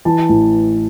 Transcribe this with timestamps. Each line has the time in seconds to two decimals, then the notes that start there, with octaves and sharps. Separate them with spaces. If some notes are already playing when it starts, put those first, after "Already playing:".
0.05 E3 A5
0.29 A1